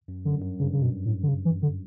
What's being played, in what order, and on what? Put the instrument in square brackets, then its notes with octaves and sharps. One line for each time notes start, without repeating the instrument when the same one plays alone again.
[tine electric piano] F#2
[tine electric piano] F#2 [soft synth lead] D3
[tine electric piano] G2
F#2
[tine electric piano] G2 [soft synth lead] C#3
[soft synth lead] C#3
B2
A2
D3
C#3
E3
D3